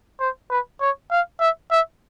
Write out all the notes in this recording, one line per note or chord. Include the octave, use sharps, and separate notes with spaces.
C5
B4
C#5
F5
E5
E5